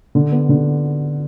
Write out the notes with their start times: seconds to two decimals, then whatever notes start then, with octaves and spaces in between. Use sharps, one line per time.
0.15 D3
0.32 B3
0.49 D3